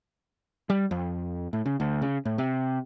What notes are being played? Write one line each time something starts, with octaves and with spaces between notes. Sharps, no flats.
G3
F2
A2
C#3
D2
C#3
A2
C3